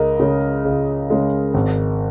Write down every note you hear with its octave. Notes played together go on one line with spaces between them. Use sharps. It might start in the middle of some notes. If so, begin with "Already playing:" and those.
Already playing: C#2 A#4 D#5
C#3 G#3
C#2
C#3 G#3
G#1